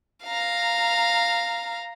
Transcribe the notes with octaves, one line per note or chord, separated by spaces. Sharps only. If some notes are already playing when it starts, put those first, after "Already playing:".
F5 A#5